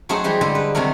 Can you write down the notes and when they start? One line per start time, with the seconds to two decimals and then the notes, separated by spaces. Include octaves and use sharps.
0.09 F#3 A3 D#4 G#4 C5 F#5
0.24 E3 G3 G4 C6
0.41 D3 G3 G#3 A4
0.55 B4
0.75 C3 D#3 F#3 A3 A#4